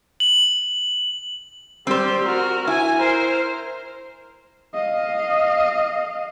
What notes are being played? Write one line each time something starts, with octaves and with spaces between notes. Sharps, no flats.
F#7
G3 C4 C5
F#4 A#4
E4 G#5
A#4 C5
D#5 F5